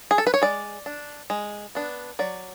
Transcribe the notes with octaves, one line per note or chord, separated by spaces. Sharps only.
G#4
A4
B4
C#5
G#3 D5
D4
G#3
B3 D4
F#3 D5